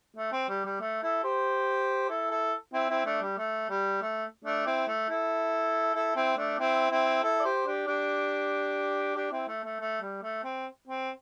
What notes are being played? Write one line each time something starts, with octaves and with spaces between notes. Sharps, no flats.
A3
C4
G3
G3
A3
E4 A4
G4 C5
E4 A4
E4 A4
C4 E4
C4 E4
A3 D4
G3
A3
G3
A3
A3 D4
C4 E4
A3
E4 A4
E4 A4
C4 E4
A3 D4
C4 E4
C4 E4
E4 A4
D5
G4 C5
D4 G4
D4 G4
D4 G4
C4 E4
A3
A3
A3
G3
A3
C4
C4